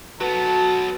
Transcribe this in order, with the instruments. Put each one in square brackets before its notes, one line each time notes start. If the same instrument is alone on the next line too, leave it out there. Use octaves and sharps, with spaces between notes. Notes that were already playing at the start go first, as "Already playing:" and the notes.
[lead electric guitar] F#3 B3 [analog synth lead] F#4 [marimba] A4 B4 [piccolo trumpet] A5